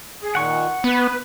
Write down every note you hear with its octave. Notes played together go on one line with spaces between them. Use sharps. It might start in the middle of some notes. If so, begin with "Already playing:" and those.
G#4
A#2 D#3 F#5 C#6
B3 B4